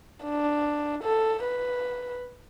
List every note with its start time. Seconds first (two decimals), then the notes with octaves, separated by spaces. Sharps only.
0.25 D4
1.03 A4
1.43 B4